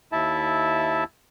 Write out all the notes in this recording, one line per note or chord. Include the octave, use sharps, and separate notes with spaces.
D#2 E4 E5 A5